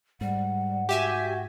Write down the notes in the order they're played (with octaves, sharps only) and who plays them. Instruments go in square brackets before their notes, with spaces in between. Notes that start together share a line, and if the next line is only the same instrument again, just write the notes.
[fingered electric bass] G#2 [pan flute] G3 [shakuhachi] F#5
[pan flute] F#4 [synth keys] G4 E5 G#5